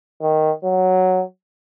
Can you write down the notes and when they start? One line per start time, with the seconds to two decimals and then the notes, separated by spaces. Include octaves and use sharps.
0.22 D#3
0.64 F#3